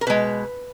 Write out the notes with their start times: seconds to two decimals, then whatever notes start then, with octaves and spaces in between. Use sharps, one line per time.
0.01 A#4
0.07 B2 G#3 B4